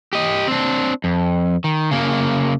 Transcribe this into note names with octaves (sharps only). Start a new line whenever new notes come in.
G4 D#5
C4 D4
F2
D#3
C#3 A#3